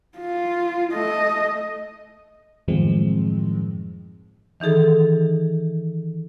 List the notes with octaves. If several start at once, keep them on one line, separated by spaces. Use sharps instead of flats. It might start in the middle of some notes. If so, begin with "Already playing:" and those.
F4
A3 D#5
F#2 A2 D#3 F3 G#3 C4
D#3 E3 D#4 G#4 A4